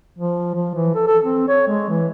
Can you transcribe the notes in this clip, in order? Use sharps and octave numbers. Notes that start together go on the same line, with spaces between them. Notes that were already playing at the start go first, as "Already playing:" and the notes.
F3
F3
E3
A4
A4
C4
C#5
G#3
E3